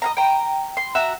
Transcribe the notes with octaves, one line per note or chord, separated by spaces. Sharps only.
D#5 F5 A#5
G5 A#5
C6
F#4 E5 A#5